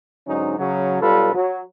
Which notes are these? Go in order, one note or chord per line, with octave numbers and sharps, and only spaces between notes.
G#2 D3 F#3 C#4 D#4
C#3 F#3
B1 G3 F4 A4 B4
F#3